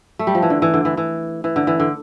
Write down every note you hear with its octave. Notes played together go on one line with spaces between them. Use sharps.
A3
G3
F3
E3
D3
E3
D3
E3
E3
E3
D3
E3
D3